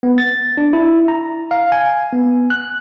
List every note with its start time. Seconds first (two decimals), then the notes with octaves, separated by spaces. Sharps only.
0.03 B3
0.18 A6
0.57 D4
0.73 E4
1.08 A#5
1.51 F5
1.72 G#5
2.13 B3
2.50 F#6